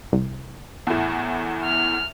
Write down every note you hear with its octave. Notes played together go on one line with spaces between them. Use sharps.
C2
E2 A2
F6